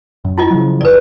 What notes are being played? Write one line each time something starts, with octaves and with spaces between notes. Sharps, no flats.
F#2
E4 F4 D#5
C#3 F3 F#3
F#1 D#2 B4 D5